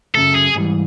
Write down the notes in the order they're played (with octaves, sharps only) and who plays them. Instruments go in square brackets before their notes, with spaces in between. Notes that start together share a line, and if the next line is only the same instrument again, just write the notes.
[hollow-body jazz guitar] F#2 C#3 F#3 A3 [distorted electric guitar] A4
[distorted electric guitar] G#4
[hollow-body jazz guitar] G#2 E3 G3